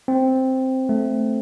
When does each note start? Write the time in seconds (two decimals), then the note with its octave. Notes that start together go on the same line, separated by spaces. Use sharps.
0.08 C4
0.89 A3